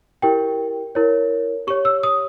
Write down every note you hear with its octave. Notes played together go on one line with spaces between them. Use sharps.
E4 G4 A#4 G5
E4 A#4 C#5
G4 C#5 C#6
E6
D#6